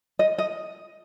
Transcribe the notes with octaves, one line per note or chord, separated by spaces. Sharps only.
D#5
D#5